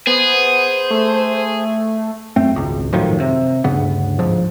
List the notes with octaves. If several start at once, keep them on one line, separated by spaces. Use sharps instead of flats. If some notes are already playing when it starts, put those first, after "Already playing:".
B3 G#4 C5
A3
F#2 A3 C4
G#1 C#2
F#2 A2 D#3 F3
C3
D2 G2 C#3 B3
D1 G#2 F3